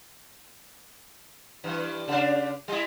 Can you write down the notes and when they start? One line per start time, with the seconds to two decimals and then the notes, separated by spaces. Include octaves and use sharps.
1.64 G2 E3
2.08 C#3 D4
2.68 G3 E4